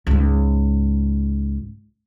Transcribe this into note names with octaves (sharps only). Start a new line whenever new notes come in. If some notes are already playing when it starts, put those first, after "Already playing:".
C#2 G#2